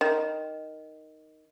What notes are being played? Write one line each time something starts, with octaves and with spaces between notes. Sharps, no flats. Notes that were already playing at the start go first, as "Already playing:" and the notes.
D#3